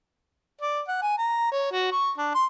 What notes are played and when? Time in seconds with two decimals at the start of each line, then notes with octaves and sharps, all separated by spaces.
0.61 D5
0.88 F#5
1.02 G#5
1.18 A#5
1.52 C#5
1.72 F#4
1.92 C#6
2.18 D4
2.34 C6